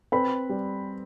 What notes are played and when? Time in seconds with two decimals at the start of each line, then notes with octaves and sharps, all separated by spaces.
0.12 C4 B4 B5
0.50 G3